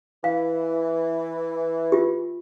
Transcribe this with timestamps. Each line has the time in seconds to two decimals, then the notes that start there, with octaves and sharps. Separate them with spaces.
0.24 E3 F5
1.92 F4 G4